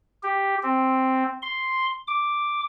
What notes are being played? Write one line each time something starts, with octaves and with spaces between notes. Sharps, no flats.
G4
C4
C6
D6